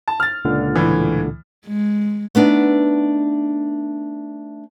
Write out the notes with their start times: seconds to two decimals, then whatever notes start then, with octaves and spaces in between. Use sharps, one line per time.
0.08 A5
0.20 F6 A6
0.45 C#2 A#2 D3
0.76 A2 E3
1.66 G#3
2.35 A3 B3 D4 D#4